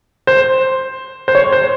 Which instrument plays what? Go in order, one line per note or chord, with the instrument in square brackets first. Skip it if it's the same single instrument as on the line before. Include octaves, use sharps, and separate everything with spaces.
[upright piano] C5
C5
C#5
C5